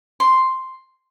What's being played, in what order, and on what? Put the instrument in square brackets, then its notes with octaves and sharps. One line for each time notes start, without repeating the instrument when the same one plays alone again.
[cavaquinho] C6